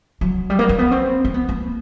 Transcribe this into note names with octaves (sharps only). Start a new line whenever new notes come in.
F#3
G3
A#3
A#3
B3
C4
C4
B3
A#3